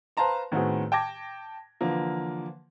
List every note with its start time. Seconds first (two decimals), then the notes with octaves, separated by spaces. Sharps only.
0.17 B4 C5 F5 A5 A#5 C6
0.52 A2 D#3 B3 C4 F#4 G#4
0.92 G5 A5 D6 G#6 A#6
1.81 D3 E3 F3 A#3